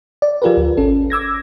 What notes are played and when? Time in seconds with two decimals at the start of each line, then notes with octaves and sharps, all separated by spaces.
0.22 D5
0.42 F3 F4 G4 G#4 A#4 B4
0.57 D2
0.77 G#1 C#4 A4
1.10 D6 E6 G#6 A#6